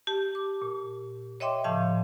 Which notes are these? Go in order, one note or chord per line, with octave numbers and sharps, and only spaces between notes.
G4 A5
D6
A#2
C#5 D#5 E5 G5 C6 D6
A2 C#3 F3 F5 A5 G6